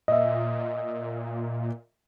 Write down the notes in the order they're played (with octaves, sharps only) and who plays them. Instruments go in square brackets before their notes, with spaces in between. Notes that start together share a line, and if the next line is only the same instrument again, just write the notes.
[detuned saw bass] A#2 [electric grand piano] D#5 E5